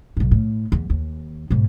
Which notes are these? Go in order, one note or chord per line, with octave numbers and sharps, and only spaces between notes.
B1 G#2
A2
E2
D#2
G#2 B2